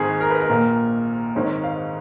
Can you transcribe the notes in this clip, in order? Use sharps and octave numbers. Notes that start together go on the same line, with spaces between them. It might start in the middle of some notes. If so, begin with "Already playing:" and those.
Already playing: G#1 G#2 D#3 G#4
A#4
B4
A#4
A#1 A#2
G#1 G#2 D#3 C#5
F5